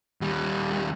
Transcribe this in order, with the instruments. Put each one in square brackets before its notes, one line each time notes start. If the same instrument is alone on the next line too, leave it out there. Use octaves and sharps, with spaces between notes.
[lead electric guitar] D#2 G3